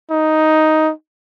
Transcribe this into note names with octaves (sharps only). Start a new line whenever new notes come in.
D#4